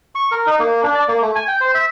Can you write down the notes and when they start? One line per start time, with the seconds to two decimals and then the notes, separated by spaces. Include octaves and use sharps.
0.15 C#6
0.32 A#4
0.46 D#4
0.59 A#3
0.83 D4
0.95 D5
1.08 A#3
1.21 A3
1.35 G#5
1.48 G5
1.61 C5
1.75 E5